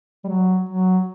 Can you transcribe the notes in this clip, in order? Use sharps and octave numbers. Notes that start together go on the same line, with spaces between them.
G3
F#3
F#3